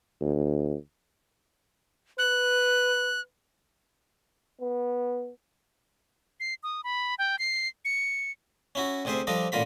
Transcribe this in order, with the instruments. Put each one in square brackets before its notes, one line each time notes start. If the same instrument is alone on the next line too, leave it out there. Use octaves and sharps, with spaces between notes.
[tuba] D2
[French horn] B4 [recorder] F#6
[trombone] B3
[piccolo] C7
D#6
B5
G5
C7
C#7
[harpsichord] C#4 E4 F#4
D2 C3 G#4 C5 E5
F3 G3 D4 A4 D#5 D6
A1 A#2 D3 F4 A#4 B5